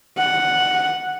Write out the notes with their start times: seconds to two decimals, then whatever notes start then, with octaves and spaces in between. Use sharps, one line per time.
0.18 F#5